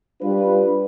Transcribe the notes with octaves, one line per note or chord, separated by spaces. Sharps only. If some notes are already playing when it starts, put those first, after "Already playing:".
G3 D4 F4 B4